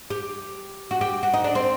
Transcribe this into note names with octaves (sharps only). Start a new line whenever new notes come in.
G4
F#4
G4
F#4
D#4
D4
C4